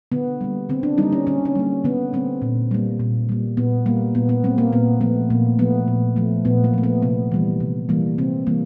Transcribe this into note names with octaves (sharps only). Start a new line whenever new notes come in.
D3 B3
G3 A#3
D3 C4
D4
G3 A#3 D#4
C#4
D3 C#4
C#4
G3 A#3
D3 B3
G3 A#3 C4
A#2
G3 A#3
A#2
G3 A#3
A#2 B3
G3 A#3
A#2 B3
B3
G3 A#3 C4
A#3
A#2 B3
F3 A3 B3
A#2 A#3
F3 A3 B3
A#2
F3 A3
A#2 B3
A#3
F3 A3
B3
C3 B3
E3 G3 A#3
C3
E3 G3 A#3
C3 C4
E3 G3 A#3